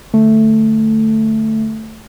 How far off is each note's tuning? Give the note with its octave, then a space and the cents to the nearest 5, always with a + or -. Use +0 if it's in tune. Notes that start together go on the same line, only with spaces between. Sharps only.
D3 +15 A3 +0